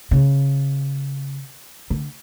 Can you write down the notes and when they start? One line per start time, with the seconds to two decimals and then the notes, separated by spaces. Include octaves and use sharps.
0.11 C#3
1.90 D3